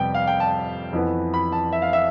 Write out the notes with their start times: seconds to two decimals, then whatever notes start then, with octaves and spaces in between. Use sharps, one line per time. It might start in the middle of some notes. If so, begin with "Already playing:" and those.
Already playing: F2 C3 G3 B3 G5
0.14 F5
0.27 G5
0.40 A5
0.93 F2 E3 B3
1.34 B5
1.52 A5
1.72 E5
1.82 F5
1.93 E5